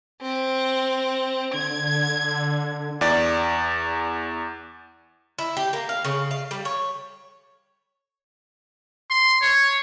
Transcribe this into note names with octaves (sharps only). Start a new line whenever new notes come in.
C4
D3 G#6
E2 D5
E4
G4
A#3
F5
C#3
F5
G3
C#5
C6
C#5